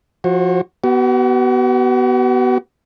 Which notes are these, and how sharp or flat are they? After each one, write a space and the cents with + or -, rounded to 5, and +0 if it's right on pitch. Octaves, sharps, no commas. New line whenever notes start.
F3 +0 F#4 +0 C5 +45
B3 +0 F#4 +45